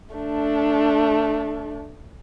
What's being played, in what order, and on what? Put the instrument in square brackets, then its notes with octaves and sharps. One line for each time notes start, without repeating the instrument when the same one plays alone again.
[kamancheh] A3 D4